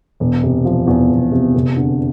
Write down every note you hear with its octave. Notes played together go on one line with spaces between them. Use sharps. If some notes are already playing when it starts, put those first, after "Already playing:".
E1
C3
F3
E2
E1
C3
F1
D3